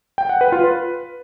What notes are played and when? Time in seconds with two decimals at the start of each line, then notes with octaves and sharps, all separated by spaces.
0.18 G5
0.29 F#5
0.41 B4
0.52 F4
0.64 B4